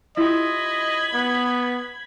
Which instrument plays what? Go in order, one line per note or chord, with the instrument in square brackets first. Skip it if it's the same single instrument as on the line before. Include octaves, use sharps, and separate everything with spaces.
[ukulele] E4 F4 G4 [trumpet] D#5 [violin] B5 G#6
[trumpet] B3